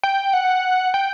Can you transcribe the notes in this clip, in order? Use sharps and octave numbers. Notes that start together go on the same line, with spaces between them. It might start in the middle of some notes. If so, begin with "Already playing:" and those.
G5
F#5
G5